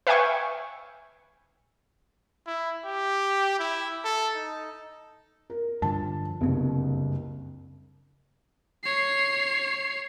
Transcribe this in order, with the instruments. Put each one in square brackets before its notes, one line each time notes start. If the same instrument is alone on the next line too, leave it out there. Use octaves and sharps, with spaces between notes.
[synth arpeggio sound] B4 E5 F5 G5 G#5 C#6
[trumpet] E4
G4
E4
A4
D#4
[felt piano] A#4
[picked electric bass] G2 D3 F3 [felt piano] A5
[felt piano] F#1 C2 [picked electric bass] G2 C#3
[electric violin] C#5 C7